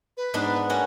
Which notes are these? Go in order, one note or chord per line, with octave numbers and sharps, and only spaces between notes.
B4
G#2 B3 D4
A#3 C#4 F#4